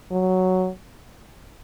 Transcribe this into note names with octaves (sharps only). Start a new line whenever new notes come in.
F#3